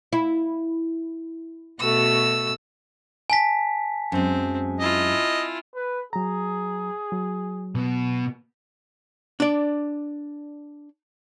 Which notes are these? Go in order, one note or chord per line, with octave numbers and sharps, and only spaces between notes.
E4
B2 A3 F#4 E6
G#5 A5 B6
F#2 G#3 C4
E4 F4 D#5
B4
F#3 G#4 A#5
F#3
B2 B3
D4 D5